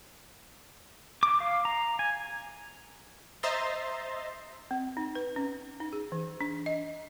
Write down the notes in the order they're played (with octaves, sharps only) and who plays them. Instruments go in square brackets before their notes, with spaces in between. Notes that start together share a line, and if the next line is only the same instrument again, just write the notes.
[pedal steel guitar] D6
F5
A#5
G#5
[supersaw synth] C5 D#5 E5 A#5 C6 A6
[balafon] C4
D#4
B4
C#4
D#4
G#4
E3
D4
D#5